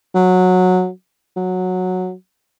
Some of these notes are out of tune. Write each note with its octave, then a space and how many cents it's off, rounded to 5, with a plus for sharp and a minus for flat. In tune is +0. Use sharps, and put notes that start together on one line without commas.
F#3 -15
F#3 -10